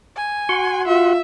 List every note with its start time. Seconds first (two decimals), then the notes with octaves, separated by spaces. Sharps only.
0.16 G#5
0.49 F#4 F#5 C6
0.87 F4 E5